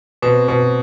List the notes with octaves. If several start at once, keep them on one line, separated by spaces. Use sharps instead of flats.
B2 C4 C5
B2